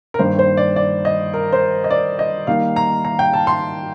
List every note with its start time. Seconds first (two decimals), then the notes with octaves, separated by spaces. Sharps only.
0.14 A#4
0.19 G2 D#3 A#3 D4 C5
0.39 C5
0.57 D5
0.76 D5
1.05 D#5
1.34 A#4
1.52 C5
1.84 D#5
1.91 D5
2.19 D#5
2.47 D#3 G3 A#3 D#4 F5
2.76 A#5
3.05 A#5
3.19 G5
3.33 A5
3.47 C6